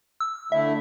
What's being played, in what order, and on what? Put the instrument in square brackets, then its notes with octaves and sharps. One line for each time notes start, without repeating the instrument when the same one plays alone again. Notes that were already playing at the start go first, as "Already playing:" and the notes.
[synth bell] E6
[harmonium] D3 A3 E4 [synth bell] E5